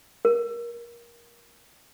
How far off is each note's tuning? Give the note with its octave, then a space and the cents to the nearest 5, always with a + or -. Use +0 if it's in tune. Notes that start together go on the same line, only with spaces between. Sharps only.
A#4 +20